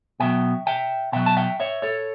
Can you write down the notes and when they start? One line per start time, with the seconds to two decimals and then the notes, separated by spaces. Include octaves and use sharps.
0.20 B2 F#3 E5 G5
0.67 E5 G5
1.12 B2 F#3 E5 G5
1.26 A5
1.37 E5 G5
1.60 C#5 E5
1.82 A4 C#5